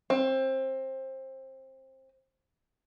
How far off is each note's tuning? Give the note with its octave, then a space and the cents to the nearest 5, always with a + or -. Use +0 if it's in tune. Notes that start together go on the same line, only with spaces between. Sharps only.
C4 +20